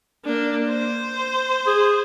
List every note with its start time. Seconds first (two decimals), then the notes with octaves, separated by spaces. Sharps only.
0.25 A#3 D4
0.68 C5
1.67 G#4